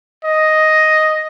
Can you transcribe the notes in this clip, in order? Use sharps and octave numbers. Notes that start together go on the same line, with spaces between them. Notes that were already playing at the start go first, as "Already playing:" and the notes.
D#5